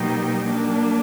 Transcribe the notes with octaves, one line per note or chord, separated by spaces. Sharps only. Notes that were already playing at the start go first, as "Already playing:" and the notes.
Already playing: B2 F#3 A#3 D#4 G4
F#3 A#3 D4